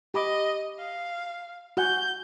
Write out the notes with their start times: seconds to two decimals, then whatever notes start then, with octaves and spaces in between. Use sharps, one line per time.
0.14 G4 D#5 B5 D6
0.79 F5
1.77 F#4 F#5 G#5 G6